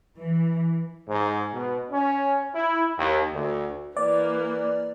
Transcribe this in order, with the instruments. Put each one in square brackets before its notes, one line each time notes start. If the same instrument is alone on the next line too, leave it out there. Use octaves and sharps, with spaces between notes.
[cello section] E3
[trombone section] G#2
B2
C#4
E4
D#2
D2
[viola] E3 A#3 [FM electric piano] D5